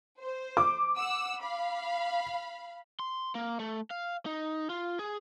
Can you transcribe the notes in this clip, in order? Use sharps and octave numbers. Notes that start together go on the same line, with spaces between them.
C5
D6
F#5 E6
F5 B5
C6
A#3
A3
F5
D#4
F4
G#4